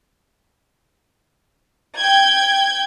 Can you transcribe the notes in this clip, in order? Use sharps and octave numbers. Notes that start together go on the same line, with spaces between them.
G5 G6 G#6